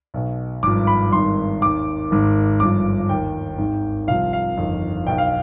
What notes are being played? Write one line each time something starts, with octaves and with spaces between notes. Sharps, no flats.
B1 B2
G#1 G2 F3 D6
B5
G#1 G2 D#3 C6
D#2 D#3 D6
G#1 G#2 D#3
G1 G2 F3 D6
D#2 D#3 G5
G#1 G#2 D#3
C2 C3 F3 F5
F5
G1 F2 D#3
B1 B2 G5
F5